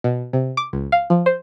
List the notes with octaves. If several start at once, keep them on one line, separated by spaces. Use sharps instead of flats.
B2
C3
D6
C#2
F5
F3
C5